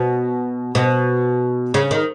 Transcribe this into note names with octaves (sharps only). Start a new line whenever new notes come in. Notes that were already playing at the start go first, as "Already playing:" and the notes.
Already playing: B2
B2
C#3
D#3